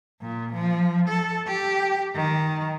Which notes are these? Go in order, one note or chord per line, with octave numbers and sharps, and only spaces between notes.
A#2
F3
A4
G4
D#3